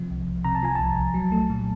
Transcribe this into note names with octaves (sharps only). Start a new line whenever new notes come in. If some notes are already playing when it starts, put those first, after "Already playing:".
Already playing: C3 F3
C2
C2
C3 A#5
A5
F3 G#5
C2 A5
C2
F#3
A3
A#2